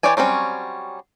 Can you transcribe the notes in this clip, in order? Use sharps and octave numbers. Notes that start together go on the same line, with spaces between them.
E3 G4 C#5 D5 G#5
F#3 G3 C4 C#4